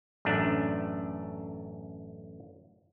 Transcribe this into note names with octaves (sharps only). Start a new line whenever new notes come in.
A1 F#2 A3 D4